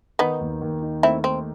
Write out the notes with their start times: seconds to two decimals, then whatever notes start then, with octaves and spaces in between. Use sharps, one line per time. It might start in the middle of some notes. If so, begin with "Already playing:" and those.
0.19 D#3 B3 D#4
0.40 D#2
0.61 D#2
0.82 D#4
1.03 A3 C4 E4
1.24 C4 D#4